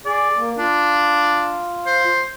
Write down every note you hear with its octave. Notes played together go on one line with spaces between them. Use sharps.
G#4 D5
A#3
D4 F4
C5